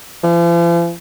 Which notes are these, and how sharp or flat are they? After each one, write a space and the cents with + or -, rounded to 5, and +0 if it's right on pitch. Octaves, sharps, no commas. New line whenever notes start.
F3 -45